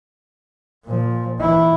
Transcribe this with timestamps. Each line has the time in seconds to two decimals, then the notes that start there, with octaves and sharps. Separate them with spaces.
0.85 A#2 F3
1.39 E3 E4